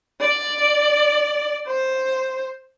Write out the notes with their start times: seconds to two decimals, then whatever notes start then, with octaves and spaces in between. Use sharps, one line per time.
0.21 D5
1.67 C5